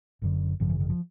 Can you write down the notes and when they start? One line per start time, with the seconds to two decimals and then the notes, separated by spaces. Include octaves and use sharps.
0.22 F#1 F#2 D3
0.60 G#1 F#2 C#3 F3
0.70 E3
0.80 D#3
0.90 F3